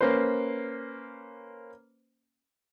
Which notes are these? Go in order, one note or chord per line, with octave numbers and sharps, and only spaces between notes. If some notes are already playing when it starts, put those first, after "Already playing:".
A#3 C#4 B4 C5